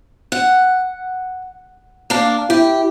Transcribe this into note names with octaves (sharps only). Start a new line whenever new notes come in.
F#5
A#3 D4
E4 G4